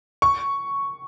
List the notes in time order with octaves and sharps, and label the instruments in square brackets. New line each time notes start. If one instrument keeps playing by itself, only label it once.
[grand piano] C#6